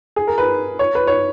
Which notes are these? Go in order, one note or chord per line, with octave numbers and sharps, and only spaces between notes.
G#4
A#4
B4
C#5
B4
C#5